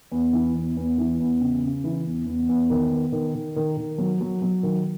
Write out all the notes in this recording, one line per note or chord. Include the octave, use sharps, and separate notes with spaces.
E2
E3
E2
E2
E3
E2
C#3
C#3
E3
E2
E2
E2
D#3
B3
D#3
D#3
D#3
D#3
F#3
F#3
F#3
D#3